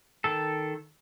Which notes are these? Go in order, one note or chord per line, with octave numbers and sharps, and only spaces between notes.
D#3 A4